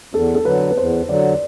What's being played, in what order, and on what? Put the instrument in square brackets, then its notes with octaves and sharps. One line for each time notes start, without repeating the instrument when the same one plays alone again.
[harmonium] E2 [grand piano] A4
[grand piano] A4
[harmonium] D3 F#3 [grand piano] B4
[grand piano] B4
[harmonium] E2 [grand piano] C5
[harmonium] D3 F#3 [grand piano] D5